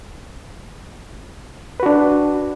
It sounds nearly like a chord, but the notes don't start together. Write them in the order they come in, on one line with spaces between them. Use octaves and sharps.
B4 F#4 D4